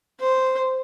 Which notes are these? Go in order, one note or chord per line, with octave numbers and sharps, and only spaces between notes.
C5